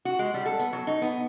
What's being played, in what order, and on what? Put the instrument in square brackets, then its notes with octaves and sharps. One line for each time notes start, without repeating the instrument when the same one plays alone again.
[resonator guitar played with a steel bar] F#4
G#3
G3
A4
B3
F#3
D#4
B3